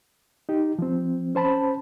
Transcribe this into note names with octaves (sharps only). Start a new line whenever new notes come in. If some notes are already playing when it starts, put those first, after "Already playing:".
D#4 G4
F3 C4
C#4 C5 A5 B5